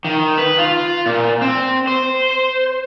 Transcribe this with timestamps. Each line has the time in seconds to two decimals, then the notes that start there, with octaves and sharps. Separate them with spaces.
0.05 D#3
0.38 B4
0.58 F4
1.06 A#2
1.42 C4
1.88 C5